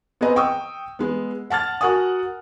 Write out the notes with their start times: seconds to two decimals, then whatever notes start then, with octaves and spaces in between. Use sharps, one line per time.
0.21 B3 C4 G#4 B4 D#5 A#5
0.36 G5 C#6 D#6 E6
0.99 G#3 B3
1.50 F#5 A5 F6 A6
1.81 F#4 A#4 F#5 G#5 D#6